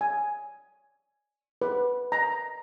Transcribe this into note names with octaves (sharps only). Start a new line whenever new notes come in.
G#5
B4
A#5